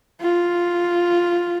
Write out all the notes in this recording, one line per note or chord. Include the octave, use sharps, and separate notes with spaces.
F4